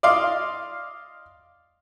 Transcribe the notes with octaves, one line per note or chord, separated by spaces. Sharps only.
D5 D#5 F5 C6 D6